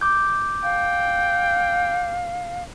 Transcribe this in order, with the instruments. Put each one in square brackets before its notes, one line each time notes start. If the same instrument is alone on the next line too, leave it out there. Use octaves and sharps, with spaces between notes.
[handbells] D6 G6
[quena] F5 [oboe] G5